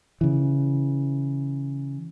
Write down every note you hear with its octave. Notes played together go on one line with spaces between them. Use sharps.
C#3 E3